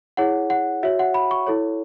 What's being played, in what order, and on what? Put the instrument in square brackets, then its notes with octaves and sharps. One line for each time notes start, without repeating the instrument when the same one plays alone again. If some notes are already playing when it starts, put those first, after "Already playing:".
[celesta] E4 G#4 C#5 F#5
F#5
F#4 C#5 E5
F#5
B5
C#6
E4 A4 C#5